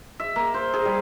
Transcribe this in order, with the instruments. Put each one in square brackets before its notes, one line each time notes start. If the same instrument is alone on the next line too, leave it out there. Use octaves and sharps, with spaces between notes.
[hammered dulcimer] E5
A#3
C5
G#4
G3